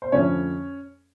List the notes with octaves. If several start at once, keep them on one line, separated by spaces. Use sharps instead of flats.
C5
F2 D3 F3 A3 C#4 C#5